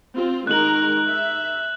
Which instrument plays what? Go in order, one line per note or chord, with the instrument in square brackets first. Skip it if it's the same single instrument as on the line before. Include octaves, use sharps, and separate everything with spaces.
[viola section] C4 F4
[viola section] D#3 G#3 A#4 [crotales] F#6 F#7
[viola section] E5